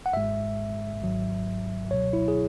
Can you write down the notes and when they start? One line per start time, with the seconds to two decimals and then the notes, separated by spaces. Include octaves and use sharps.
0.06 F#5
0.13 G#1 G#2 G#3 E5
1.02 G#1 G#2 F#3
1.91 C#2 B2 F#3 C#5
2.13 E4
2.28 G#4